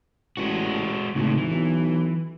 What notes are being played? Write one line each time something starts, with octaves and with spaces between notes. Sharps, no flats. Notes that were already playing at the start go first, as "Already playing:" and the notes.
A1 G#3 F#4
G#1 C#2 A2
E3
B1